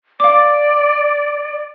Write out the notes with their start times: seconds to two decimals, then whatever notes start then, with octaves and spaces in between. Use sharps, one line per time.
0.20 D5 F5 D6